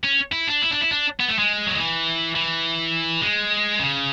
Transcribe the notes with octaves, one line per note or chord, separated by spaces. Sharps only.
C#4
E4
D4
E4
D4
E4
D4
B3
A3
G#3
F#3
E3
E3
G#3
C#3